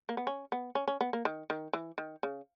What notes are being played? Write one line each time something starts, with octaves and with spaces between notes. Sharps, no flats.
A#3
B3
C#4
B3
C#4
C#4
B3
A#3
D#3
D#3
E3
D#3
C#3